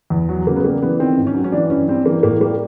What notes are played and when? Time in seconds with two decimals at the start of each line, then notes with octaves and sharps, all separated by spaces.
0.10 E2
0.29 F#3
0.46 C#3 A#3
0.56 B3
0.64 G3 A#3
0.82 E3 B3
0.99 D#3 C4
1.17 G#2
1.27 C#4
1.34 F#3
1.44 C#4
1.52 E3 D4
1.70 G2 C#4
1.88 G3 C4
2.06 E3 A#3
2.23 A2 A#3
2.41 G3 A#3